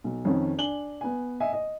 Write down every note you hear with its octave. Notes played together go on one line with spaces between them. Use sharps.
B1
F2 D#3 C#4
D4 G#5 F#7 G7
B3 G#5
D#5 E5 G#5
D#5